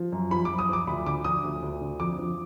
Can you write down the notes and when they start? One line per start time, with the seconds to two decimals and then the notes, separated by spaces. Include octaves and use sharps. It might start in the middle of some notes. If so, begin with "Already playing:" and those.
Already playing: F3
0.12 F#2
0.31 F3 B5
0.45 F#2 D6
0.59 D#6
0.69 F3 D6
0.87 D2 B5
1.06 D3 D6
1.24 F3 D#6
1.44 D2
1.62 D2
1.81 D3
2.00 F2 D6
2.18 F3